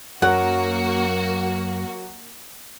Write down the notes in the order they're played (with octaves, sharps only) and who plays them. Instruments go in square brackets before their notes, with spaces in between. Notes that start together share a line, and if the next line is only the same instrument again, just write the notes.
[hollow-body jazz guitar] F#2 [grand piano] F#3 A#4 C#6 [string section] A#3 F#4 [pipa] F#5